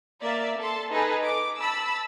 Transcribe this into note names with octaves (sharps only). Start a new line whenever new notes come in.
A#3 D5 E5
A4 A5 C6
D#4 G#4 A4 B4
D6
A5 B5 E6